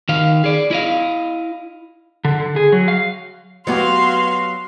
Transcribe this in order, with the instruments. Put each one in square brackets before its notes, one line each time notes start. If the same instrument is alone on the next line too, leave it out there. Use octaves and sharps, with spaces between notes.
[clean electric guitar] D#3 F5
G#4 D5
E4 D#5 F5
[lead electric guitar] D3
D3
G#4
F#3
F5
[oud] F#3 B3 G4 [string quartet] F#4 F5 C6